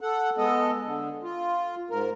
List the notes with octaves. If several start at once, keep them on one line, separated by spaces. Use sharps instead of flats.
A4 F#5
G#3 B3 A4 D#5
D3
F4
G#2 A#4